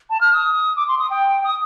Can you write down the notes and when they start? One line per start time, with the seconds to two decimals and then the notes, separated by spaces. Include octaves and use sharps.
0.10 A5
0.21 F6
0.33 D#6
0.76 D6
0.88 C6
0.99 D#6
1.10 G5
1.44 D#6